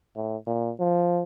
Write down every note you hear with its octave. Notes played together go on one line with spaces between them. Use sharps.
A2
A#2
F3